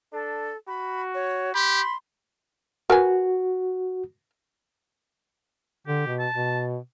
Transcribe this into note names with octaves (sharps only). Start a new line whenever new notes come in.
D4 A4
F#4 B5
C#5
G4 B5 C6
F#4 A#4 B4 G#5
D3 G4
B2
A5
B2